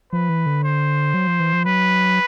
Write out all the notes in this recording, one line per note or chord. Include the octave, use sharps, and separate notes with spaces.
F3 B4
E3
D3
C5
F#3
F3
E3
F3
F#3 B4